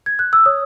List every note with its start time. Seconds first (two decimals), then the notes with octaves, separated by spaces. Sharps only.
0.06 G#6
0.19 F#6
0.33 E6
0.46 C#5 D#6